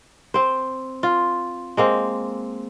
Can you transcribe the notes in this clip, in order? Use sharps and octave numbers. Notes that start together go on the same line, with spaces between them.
C4 C5
F4
G#3 A#3 C4